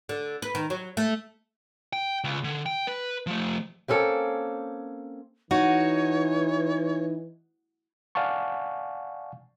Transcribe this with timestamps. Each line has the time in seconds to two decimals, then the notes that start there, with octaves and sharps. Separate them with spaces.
0.09 D3
0.42 B4
0.55 D#3
0.70 F#3
0.97 A3
1.93 G5
2.24 C#2
2.44 D3
2.66 G5
2.87 B4
3.27 F3 A3
3.88 A#3 C4 C#4 A4
5.51 E3 D#4 F#4 C#5
8.15 D5 F5 F#5 G#5 A5 C#6